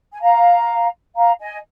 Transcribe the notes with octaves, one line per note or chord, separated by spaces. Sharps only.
G#5
F5 A#5
F5 A#5
D#5 G#5